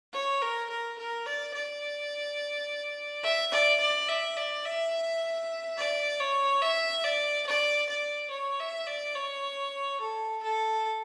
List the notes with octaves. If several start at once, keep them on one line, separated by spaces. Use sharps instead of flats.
C#5
A#4
A#4
A#4
D5
D5
E5
D5
D5
E5
D5
E5
D5
C#5
E5
D5
D5
D5
C#5
E5
D5
C#5
A4
A4